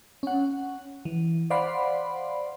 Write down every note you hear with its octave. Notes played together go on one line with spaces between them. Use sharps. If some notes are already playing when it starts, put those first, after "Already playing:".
C#4 F#5
E3
C5 D5 F5 F#5 B5 C6